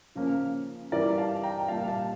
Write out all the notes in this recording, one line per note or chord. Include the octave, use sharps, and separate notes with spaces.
C#3 F3 A#3 C#4
G2 E3 G3 A#4 D5
F5 A5
G5 A#5
A#2 G3 A#3 F5 A5
F5 A5